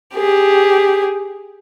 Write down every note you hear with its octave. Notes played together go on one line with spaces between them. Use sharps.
G4 G#4